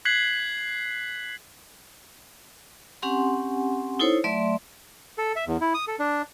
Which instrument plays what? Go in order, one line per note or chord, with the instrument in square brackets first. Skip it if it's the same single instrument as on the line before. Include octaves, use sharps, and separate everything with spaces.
[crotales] F#6 G#6 B6 C7 F#7
[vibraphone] C4 C#4 G4 F#5 G#5 C6
D#4 E4 A4 C5 C#5
F#3 A3 D5 E5 C6
[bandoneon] A4
E5
E2
E4
D#6
A4
D4